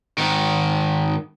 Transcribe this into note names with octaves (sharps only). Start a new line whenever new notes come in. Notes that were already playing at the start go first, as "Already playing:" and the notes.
G#2 D#3